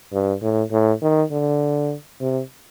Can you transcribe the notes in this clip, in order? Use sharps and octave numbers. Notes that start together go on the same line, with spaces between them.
G2
A2
A2
D#3
D3
C3